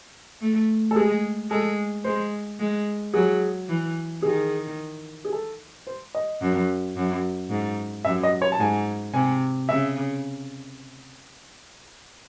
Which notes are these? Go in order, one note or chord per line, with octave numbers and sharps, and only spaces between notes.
A3
A4
G#3 G#4
G#3 A4
G#3 C5
G#3
F#3 G#4
E3
D#3 G#4
G#4
A4
C5
D#5
F#2
F#2
G#2
F#2 E5
D#5
C#5
A5
G#2 G#5
C3 G#5
C#3 E5